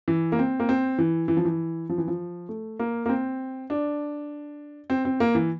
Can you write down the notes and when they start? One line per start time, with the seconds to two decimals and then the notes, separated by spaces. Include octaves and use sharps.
0.08 E3
0.32 A#3
0.39 C4
0.60 A#3
0.69 C4
0.99 E3
1.28 E3
1.37 F3
1.45 E3
1.89 F3
1.98 E3
2.08 F3
2.49 A3
2.79 A#3
3.06 A#3
3.09 C4
3.70 D4
4.90 C4
5.05 C4
5.20 A#3
5.35 E3